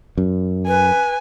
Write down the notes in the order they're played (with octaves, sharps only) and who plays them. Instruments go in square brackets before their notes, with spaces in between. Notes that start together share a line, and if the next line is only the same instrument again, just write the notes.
[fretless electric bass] F#2
[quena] B4 [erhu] G#5